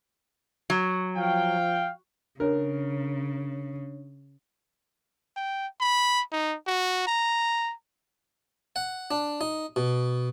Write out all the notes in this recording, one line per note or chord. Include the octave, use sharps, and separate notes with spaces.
F#3
F3 F5 G5
C#3 D4 A#4 C#5
G5
B5
D#4
F#4
A#5
F#5
D4
D#4
B2